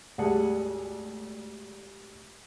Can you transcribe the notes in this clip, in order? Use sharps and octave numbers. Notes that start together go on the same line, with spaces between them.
G#1 D2 G3 G#4 F#5 A5